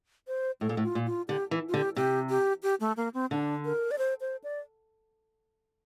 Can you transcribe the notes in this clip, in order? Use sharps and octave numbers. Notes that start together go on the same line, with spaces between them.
C5
A2 A4
A#2
A2
F4
A#2
F4
D3 G4
E3
F4
D3 G4
C3 G4
G4
G4
A3
A#3
C4
D3 D4
A#4
D5
C5
C5
D5